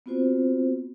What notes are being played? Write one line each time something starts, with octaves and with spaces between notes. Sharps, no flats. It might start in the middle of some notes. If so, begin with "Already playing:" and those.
B3 C4 F4 F#4 C5